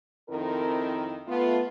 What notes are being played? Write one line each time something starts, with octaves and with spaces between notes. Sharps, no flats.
F2 D#3 C4 E4 A4 A#4
A3 B3 F4